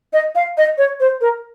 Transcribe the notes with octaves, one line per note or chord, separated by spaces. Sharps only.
D#5
F5
D#5
C#5
C5
A#4